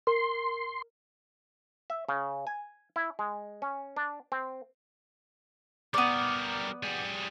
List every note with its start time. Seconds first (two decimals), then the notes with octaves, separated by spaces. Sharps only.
0.07 A#4 C6
1.90 E5
2.09 C#3
2.47 G#5
2.96 E4
3.19 G#3
3.62 C#4
3.97 D4
4.32 C4
5.94 G3 B3 A#4 D5
6.83 G3 G#4